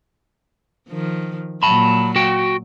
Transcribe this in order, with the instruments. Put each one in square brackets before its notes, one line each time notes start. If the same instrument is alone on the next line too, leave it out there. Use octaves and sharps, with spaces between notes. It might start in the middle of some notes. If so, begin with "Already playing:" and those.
[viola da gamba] D#3 F3
[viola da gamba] A#2 F#3 [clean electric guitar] A5 B5
[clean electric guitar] F#4 G5